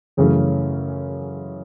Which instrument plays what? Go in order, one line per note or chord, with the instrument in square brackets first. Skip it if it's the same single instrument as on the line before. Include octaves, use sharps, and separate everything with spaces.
[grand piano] F#2 C#3 E3 A3 C#4